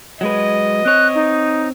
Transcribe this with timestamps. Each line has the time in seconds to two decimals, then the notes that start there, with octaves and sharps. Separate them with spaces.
0.21 F#3 G#3 B4 D#5
0.85 C4 C#5 F#6
1.15 D#4